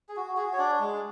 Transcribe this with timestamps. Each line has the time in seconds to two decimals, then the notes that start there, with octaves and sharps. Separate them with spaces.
0.09 G#4
0.17 F#4
0.37 F#4 G#4
0.53 C#5
0.58 D4 D5
0.79 G#3